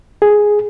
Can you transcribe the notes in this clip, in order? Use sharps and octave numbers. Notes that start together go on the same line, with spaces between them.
G#4